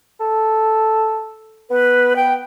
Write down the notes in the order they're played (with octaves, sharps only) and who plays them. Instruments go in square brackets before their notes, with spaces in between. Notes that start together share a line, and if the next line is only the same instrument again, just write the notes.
[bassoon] A4
[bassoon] B3 [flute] B4
[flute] G5